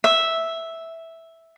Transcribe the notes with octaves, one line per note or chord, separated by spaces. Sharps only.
E5